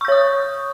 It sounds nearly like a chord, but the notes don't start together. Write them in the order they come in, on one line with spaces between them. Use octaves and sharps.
C#6 G6 C#5 D#6